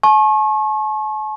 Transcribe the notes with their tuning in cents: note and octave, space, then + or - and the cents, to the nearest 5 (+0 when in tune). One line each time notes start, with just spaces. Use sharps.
A5 -45 C#6 -35